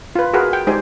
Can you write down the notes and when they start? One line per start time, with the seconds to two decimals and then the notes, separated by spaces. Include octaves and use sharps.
0.15 F4 B4
0.34 F#4 G#4 A#4 B4 F#5
0.53 G5
0.67 G#3 D#4 G4 C5 D5 G#5